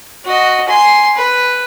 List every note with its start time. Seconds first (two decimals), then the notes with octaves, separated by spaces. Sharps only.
0.25 F#4 D#5
0.69 G#5 C6
1.16 B4